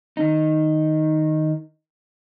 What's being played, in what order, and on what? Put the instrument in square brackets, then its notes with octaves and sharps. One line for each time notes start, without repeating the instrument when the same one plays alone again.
[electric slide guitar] D#3 D#4